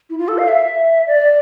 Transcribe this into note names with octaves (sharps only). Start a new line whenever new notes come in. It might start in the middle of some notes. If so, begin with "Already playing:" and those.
E4
F4
A4
F5
E5
D5